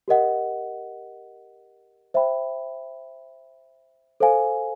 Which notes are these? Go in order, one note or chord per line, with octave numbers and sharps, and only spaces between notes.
G4 A#4 D#5 F#5
C5 E5 G5 B5
A4 C5 F5 G#5